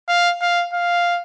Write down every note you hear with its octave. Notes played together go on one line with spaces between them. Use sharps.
F5
F5
F5